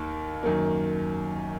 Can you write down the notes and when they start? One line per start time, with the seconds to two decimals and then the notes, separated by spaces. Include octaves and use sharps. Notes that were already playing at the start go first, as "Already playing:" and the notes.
Already playing: D#2 D#3 A#3
0.43 F#2 D#3 A#3